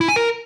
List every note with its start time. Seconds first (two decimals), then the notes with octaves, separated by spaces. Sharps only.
0.01 E4
0.08 G#5
0.16 A#4